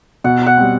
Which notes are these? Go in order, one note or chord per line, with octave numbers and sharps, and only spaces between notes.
B2 F#5
F#5
G3 C4